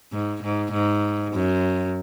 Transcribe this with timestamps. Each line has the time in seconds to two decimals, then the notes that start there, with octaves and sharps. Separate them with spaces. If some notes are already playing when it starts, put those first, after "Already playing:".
0.12 G#2
0.43 G#2
0.73 G#2
1.33 F#2